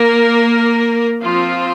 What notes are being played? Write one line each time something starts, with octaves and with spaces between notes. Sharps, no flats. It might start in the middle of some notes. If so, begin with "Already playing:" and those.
Already playing: A#3 A#4
F3 C4 F4